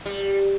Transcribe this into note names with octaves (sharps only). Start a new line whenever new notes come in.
G3